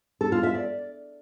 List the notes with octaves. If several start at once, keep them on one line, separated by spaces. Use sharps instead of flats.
A4
F4
E5
D5